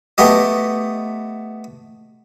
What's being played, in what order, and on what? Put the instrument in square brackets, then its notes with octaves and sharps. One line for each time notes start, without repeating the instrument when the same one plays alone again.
[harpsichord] A3 B3 G4 D#5